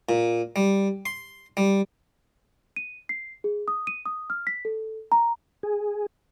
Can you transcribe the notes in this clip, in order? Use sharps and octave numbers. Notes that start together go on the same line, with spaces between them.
A#2
G3
C6
G3
D#7
C7
G#4
D#6
D#7
D#6
F6
B6
A4
A#5
G#4